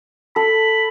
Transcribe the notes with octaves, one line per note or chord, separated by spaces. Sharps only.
A4 B5